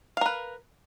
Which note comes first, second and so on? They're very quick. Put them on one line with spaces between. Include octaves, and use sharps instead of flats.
F5 A#4 B4